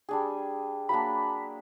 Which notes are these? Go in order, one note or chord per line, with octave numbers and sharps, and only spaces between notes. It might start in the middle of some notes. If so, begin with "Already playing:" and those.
G3 D4 G#4
F#3 A#3 D4 B5